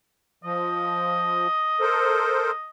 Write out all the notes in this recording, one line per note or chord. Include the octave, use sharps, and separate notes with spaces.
F3 D#5
A4 A#4 C5